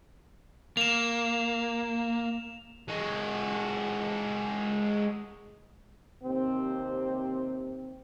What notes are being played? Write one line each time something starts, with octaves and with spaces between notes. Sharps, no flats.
A#3 E7 F7
G#3 F#4
D#2 C3 C4